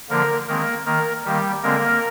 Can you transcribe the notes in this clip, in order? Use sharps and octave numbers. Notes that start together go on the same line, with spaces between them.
D3 F3 A#3 A#4
D#3 G#3 A#3 C4 A#4
D#3 A#3 A#4
D#3 G3 A#3 G4
D3 G#3 A#3 C4 A#4